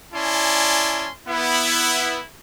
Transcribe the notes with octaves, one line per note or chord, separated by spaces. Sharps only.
C#4 E4 D5 G#5 A5 C6
B3 E4